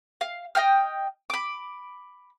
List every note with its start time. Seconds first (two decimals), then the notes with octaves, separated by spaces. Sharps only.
0.21 F5
0.55 D#5 F5 G5 F6
1.30 B5 D6